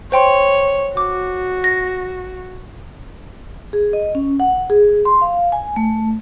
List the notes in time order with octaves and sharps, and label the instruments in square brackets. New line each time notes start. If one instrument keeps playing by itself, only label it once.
[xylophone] C5 G5 C6 [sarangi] C#5
[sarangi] F#4 [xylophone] D6
[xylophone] A#6
[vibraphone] G#4
D#5
C#4
F#5
G#4
C6
F5
G#5
A3